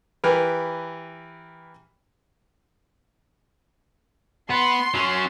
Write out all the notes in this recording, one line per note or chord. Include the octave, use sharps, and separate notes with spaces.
E3 G4 A#4 B4
B3 C6
F#3 C#4